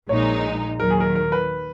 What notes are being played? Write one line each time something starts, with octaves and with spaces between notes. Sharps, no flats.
A#1 A#2 G#3 D#4 C#5
D#2 D#3 F#3 A#4
G#4
A#4
A#4
B4